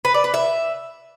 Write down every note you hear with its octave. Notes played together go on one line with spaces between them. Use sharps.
B4
D5
B4
E5